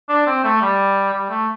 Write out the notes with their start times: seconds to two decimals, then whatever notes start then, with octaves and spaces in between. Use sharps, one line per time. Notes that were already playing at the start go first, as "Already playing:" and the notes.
0.09 D4
0.27 C4
0.44 A3
0.61 G3
1.13 G3
1.29 A3